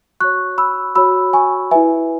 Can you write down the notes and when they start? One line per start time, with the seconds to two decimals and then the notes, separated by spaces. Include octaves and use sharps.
0.20 F#4 C#5 C#6 F#6
0.58 B5 E6
0.95 F#4 C#5 B5 E6
1.33 G#5 C#6
1.71 E4 B4 E5 G#5